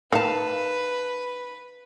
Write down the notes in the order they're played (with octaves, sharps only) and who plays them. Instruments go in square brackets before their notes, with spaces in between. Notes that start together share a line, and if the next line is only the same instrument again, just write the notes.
[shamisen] D#3 [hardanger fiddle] B4 [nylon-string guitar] F5 A5